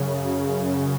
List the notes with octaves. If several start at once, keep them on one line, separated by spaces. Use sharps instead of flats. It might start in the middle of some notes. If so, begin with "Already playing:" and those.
Already playing: F#2 C#3